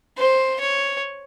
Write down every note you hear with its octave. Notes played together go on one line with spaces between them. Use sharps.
C5
C#5